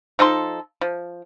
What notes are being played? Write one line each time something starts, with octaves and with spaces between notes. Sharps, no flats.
F3 D#4 A4 C6
F3